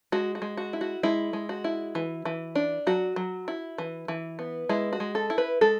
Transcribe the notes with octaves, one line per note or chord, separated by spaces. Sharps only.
G#3 F#4
F#4
G#3
F#4
E4
F#4
G#3 E4
G#3
F#4
E4
E3
E3
D4
F#3 F#4
F#3
E4
E3
E3
B3
G#3 E4
F#4
G#3
A4
E4
B4
G#3 A4